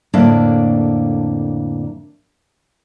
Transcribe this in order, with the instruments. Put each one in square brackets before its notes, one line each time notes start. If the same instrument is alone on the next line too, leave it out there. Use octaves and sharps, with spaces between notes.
[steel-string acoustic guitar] F2 A2 D3 A#3 D4 D5